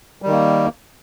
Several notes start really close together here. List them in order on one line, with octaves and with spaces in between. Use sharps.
G3 D#3 A#3